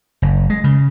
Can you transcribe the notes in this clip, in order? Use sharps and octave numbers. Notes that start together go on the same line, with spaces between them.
F#1
G#3
C#3